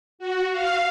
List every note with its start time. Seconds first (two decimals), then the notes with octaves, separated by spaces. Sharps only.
0.19 F#4
0.51 F5